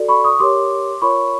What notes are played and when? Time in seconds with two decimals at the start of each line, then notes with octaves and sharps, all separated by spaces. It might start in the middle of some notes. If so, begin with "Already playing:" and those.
Already playing: F#4 A4 D5
0.08 B5 C#6
0.24 C#6 D#6
0.39 G4 A#4 C#5 C6 D6
1.02 F4 A#4 C#5 B5 C#6